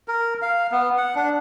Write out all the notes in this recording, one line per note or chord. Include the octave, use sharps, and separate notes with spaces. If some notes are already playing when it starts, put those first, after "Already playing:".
A#4
F5
B3
F#5
D4